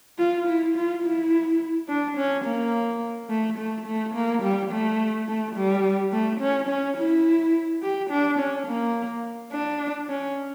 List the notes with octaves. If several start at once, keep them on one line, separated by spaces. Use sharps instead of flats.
F4
E4
F4
E4
D4
C#4
A#3
A3
A3
A3
A#3
G3
A3
A3
G3
A3
C#4
C#4
E4
G4
D4
C#4
A#3
D4
C#4